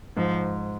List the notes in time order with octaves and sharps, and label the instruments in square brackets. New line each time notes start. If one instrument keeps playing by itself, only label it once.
[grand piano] G#2 [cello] F3